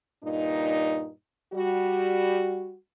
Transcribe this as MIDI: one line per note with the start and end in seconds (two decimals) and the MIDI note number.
0.24 1.10 43
0.24 1.10 46
0.24 1.10 63
1.54 2.77 55
1.54 2.77 66